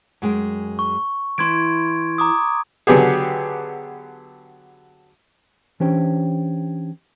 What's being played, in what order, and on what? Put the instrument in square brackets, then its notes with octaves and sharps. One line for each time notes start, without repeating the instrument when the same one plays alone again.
[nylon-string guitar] F#2 G#3 G5
[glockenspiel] C#6
[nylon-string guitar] E3 E4 [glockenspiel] C6 G#6 D7
[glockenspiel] A#5 D6 D#6
[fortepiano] D3 F#3 B3 G4 G#4
[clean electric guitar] E3 C#4 D4 G4 C5 C#5